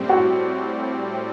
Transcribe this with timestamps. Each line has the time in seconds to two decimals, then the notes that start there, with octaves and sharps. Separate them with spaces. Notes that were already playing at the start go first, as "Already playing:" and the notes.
Already playing: A2 G3 C4
0.09 F#4